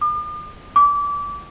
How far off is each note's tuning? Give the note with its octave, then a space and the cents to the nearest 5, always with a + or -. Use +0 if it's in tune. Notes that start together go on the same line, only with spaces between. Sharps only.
D6 +45
D6 -25